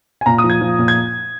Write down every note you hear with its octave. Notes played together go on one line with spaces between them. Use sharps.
G#5
A#2 A#5
D#6
F3
G#6
F3
A#2
G#6